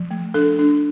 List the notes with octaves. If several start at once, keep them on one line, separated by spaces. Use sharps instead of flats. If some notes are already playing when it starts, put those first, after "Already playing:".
Already playing: F3
A3
D4 A4
D4